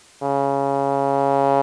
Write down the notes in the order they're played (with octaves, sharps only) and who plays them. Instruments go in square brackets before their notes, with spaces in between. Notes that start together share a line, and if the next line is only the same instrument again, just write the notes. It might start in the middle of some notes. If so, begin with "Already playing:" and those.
[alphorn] C#3